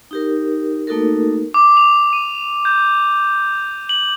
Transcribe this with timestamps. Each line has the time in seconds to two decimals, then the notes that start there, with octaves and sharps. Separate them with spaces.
0.11 D#4 G4 A#4
0.87 A3 A#3 D#4 F#4 A4 A#4
1.54 D6
1.77 F7
2.13 D#7
2.65 G6
3.89 F#7